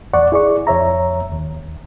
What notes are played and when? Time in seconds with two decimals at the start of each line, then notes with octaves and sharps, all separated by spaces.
0.14 E2 D5 F#5 C#6
0.32 E4 G#4 D5 C#6
0.67 F2 C#5 E5 A#5
1.32 D#2